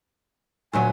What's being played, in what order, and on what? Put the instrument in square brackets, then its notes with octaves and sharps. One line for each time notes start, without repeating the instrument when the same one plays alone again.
[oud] D2 A#2 F#3 [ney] G#5